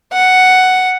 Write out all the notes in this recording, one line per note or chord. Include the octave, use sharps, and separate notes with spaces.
F#5